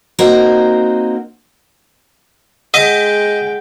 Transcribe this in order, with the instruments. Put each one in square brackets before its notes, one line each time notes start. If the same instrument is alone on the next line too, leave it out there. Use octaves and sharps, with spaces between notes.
[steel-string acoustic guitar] A#3 C4 D#4 F#4 A#4
[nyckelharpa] G#3 G5 [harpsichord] D#5 [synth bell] F#5